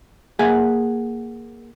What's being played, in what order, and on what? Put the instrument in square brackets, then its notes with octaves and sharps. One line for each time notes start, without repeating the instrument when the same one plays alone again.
[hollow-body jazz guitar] A#3 G#4 E5 F#5 G#5